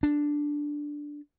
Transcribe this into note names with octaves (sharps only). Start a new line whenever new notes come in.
D4